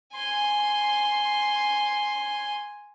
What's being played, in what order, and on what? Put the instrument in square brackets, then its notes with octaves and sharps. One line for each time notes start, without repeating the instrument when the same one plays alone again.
[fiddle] G#5 C6